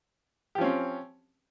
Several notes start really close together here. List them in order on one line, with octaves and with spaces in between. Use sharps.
G4 F3 C#4 C4